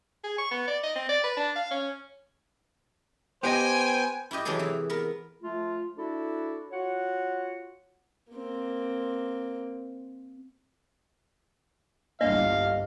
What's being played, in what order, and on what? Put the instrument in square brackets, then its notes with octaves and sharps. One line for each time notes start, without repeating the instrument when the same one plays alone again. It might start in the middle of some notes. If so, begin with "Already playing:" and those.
[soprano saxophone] G#4
C#6
B3
D5
D#5
C4
D5
B4
D4
F5
C#4
[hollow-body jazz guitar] B3 G4 D#5 [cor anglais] C5 [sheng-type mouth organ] G5 [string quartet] G#5
[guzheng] E4 F4 G4 D#5
C3 E3 F#3 E4 G#4 A4
E3
B3 A#4
[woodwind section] F3 A3 F4
D4 E4 F#4 A4
F4 F#4 C#5 F#5
[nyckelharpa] A#3 C4
[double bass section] G1 C2 G2 [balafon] A#3 D4 [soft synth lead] D#5 [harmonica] F5